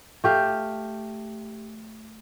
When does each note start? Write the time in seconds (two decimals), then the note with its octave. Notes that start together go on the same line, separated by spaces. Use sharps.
0.24 A3 G4 F5